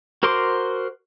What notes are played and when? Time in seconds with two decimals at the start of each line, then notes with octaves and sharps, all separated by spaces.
0.23 F#4 A#4 C5 C6 D6